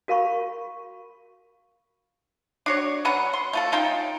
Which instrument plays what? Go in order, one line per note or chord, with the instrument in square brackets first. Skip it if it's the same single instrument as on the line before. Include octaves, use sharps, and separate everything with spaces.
[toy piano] F#4 A#4 F5 B5 C#6
[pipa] D4 F#4 C#5
F#3 C#4 B4 F#5
C6
A3 F4 A4
C#4 D#4 F4 G5